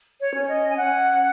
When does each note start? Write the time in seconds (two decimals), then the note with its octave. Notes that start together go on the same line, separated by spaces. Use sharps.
0.20 C#5
0.34 C#4
0.41 C#5
0.48 D#5
0.70 G#5
0.77 C#4 F#5